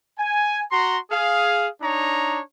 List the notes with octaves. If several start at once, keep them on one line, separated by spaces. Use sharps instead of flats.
G#5
F#4 A#5 C6
G#4 F5
D4 D#4 C#5 A#5